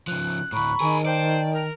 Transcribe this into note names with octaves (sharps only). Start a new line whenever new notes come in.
C#3 F3 F#6
D2 A2 A#5 B5 C#6
D#3 G#4 A#4 G#5
C5 D5 G5 A5
A#4